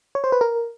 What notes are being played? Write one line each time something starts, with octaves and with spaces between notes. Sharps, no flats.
C#5
C5
B4
A#4